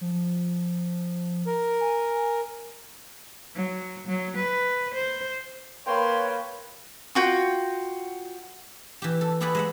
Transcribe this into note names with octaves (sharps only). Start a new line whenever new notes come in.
F3
A#4
G#5
F#3
F#3
B4
C5
A#3 B4 C#5 G5 C6
F4 F#4 G5
E3 G4
A4
E4 G4 G#4 B4 D5 F#5
G#3 E5 F#5